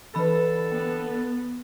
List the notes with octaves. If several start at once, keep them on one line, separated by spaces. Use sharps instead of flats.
D3 E3 A4 B4 A5 B5
B3 G5